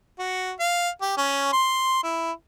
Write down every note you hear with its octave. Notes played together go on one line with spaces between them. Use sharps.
F#4
F5
G4
C#4
C6
E4